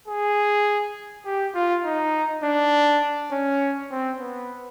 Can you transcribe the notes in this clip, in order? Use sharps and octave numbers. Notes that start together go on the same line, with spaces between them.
G#4
G4
F4
D#4
D4
C#4
C4
B3